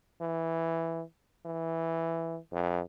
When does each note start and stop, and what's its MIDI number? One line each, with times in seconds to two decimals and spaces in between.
0.21 1.02 52
1.45 2.37 52
2.52 2.80 41